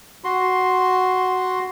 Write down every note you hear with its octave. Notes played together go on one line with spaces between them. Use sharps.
F#4 C6